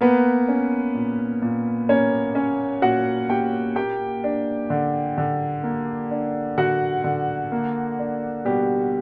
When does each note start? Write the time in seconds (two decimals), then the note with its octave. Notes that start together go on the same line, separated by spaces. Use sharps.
0.01 A#3 B3 B4
0.48 C#4
0.95 A#2
1.42 A#2
1.89 A#3 C#4 C#5
2.35 C#4
2.82 A#2 F#4 F#5
3.29 A#2 G4 G5
3.76 A#3 G4 G5
4.24 D4
4.70 D3
5.18 D3
5.63 A#3
6.11 D4
6.58 D3 F#4 F#5
7.04 D3
7.52 A#3
7.99 D4
8.45 B2 G3 G4